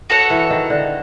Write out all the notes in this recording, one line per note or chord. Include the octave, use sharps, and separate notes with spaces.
F#4 A4 C#5 F#5
E3
D#3
D3